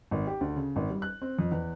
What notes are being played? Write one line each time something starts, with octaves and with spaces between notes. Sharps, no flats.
G#1
G4
D2
C#3
G#1
G3
F#6
C4
F2
E2